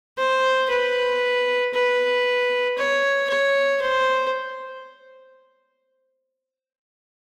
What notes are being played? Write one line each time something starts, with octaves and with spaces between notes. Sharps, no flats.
C5
B4
B4
C#5
C#5
C5